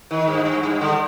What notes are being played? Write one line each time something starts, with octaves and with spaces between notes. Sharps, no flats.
D#3
G2
G2
G2
D3